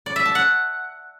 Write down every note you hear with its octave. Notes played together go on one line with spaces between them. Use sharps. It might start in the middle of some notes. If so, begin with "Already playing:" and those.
D5
E5
A5
F#5